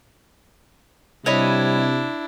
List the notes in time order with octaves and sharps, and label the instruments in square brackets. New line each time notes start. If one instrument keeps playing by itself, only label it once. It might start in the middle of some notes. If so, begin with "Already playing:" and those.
[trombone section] C3 [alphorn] G3 [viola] D4 E4 [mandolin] C#5 D#5 B5